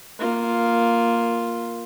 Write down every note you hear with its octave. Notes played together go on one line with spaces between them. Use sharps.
A#3 F4